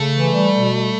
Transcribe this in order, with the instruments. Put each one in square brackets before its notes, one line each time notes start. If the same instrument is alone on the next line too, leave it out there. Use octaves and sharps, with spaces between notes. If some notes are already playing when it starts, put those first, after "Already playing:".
Already playing: [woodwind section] C#3 [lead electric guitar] A3
[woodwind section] E3
G3
B2
G3